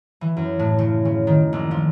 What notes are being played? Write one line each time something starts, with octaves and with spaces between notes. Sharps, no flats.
E3
F#2
A2
C#3
C#3
D#3
A#1
F3